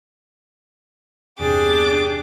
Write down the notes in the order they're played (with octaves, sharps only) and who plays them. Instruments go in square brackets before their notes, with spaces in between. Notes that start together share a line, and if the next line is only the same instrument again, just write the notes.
[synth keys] E2 G2 C3 [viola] D4 [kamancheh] G4 G#4 [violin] D6